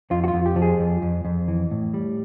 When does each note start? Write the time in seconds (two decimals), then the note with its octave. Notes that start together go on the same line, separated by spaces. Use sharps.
0.11 F2 F4
0.24 F#4
0.28 F4
0.34 F2
0.46 G4
0.56 F3
0.62 G#4
0.80 F2
1.02 F2
1.25 F2
1.48 E3
1.71 A2
1.94 G3